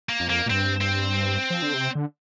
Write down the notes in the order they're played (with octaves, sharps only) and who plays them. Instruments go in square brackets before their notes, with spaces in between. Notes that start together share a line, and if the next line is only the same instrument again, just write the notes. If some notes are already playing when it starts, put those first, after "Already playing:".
[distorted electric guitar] A#3
[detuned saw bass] F2
[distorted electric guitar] A#3
[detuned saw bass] A#2
[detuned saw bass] G2 [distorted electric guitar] C4
[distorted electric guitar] C4
[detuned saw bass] F3
D3
C3
D3